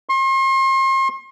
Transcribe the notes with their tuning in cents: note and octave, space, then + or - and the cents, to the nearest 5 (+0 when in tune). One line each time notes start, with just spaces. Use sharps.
C6 +40